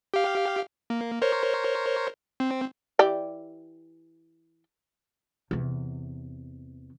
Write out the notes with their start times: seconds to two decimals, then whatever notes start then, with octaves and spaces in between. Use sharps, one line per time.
0.14 G4 F5
0.90 A#3
1.22 A#4 C5 C#5
2.40 C4
2.99 E3 G4 D5
5.51 E2 C3